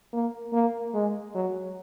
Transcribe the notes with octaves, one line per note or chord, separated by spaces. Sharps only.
A#3
A#3
G#3
F#3